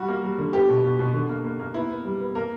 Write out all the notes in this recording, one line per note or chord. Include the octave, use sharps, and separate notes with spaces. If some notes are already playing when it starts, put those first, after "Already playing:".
Already playing: G3 F#4
A#3
G3
D3
B3 G4
B2
B2
B2
D3
A#3
A#3
A#3
B3 E4
B3
G3
B3
A#3 A#4